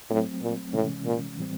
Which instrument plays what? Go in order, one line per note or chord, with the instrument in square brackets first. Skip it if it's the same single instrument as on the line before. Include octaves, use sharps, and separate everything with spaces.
[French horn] A2 [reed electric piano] F#3 A3 C4
[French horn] A#2
[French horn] A2 [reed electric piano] C3 E3 G#3 C#4
[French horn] A#2
[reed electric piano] A2 E3 G3 C4